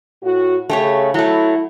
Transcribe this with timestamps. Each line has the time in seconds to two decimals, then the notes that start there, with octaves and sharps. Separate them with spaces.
0.23 A2 F#4
0.70 C#3 A3 G4 C#5
1.14 F#3 A3 E4